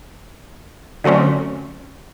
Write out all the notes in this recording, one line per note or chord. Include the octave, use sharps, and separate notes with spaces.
D3 F#3 A3 C4 C#4